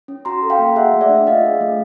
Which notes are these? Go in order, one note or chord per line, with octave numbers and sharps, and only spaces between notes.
C#4
F#4 A#5 C6
A4
F5 G5
A#3
G#4 E5 F#5
A3
D5 E5
D4
F4 D#5 F5
G#4
A3